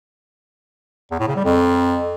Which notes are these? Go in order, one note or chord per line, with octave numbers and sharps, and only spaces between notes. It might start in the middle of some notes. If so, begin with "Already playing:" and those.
E2
A2
C#3
G3
F2